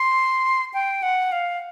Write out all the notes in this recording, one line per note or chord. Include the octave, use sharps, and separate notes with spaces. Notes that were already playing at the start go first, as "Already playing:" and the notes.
Already playing: C6
G5
F#5
F5